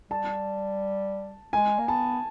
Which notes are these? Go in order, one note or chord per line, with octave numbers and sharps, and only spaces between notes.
G3 A5
G#3 G#5
A#3
B3 A5